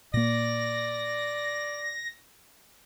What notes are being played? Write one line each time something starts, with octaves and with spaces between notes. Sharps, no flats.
A#2 A#3 D5 A#6